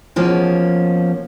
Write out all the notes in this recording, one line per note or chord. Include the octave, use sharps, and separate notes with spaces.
B2 F3 A#3 C#4